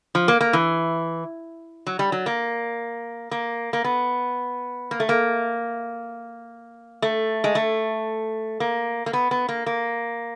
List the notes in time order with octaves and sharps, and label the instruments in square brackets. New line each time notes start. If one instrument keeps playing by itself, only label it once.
[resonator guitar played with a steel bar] F3
A#3
A#3
E3
F#3
G3
F#3
A#3
A#3
A#3
B3
A#3
A3
A#3
A3
G#3
A3
A#3
A#3
B3
B3
A#3
A#3